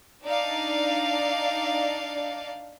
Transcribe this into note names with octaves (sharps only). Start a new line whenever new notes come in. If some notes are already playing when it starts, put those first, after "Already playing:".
D4 D#4 D5 F5